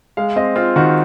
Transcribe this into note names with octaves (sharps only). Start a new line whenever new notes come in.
G#3 F5
C4 D#5
C4 F4
D#3 F#4